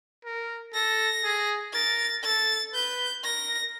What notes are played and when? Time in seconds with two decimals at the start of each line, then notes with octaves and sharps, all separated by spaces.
0.25 A#4
0.74 A4 A#6
1.24 G#4
1.73 A#4 A6
2.24 A4 A6
2.73 B4 G6
3.24 A#4 A#6